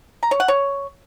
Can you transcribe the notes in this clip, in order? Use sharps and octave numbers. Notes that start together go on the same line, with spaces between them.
A#5
C#5
F#5
C#5